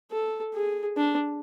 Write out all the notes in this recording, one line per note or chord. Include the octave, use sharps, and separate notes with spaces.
A4
G#4
D4